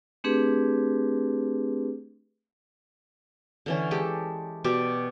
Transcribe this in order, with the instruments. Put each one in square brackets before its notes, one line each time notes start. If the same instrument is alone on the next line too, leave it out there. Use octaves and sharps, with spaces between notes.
[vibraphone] A3 C4 D4 G4 G#4 B4
[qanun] D3 E3 C#4
G#3 G4 A4
B2 G4 D5 D6